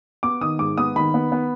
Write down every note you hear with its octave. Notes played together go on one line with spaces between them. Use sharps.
B3 D6
D#3 D#6
G#2 D6
B3 D#6
D#3 B5
B3
B3